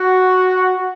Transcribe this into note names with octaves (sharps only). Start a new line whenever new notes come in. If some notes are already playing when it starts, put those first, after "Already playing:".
Already playing: F#4